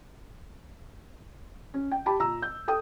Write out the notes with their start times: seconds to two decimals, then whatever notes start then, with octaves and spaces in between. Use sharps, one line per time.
1.74 C#4
1.92 G5
2.06 G4 A5 B5
2.19 A#2 A#5 E6
2.42 G6
2.68 A4 G5 D#6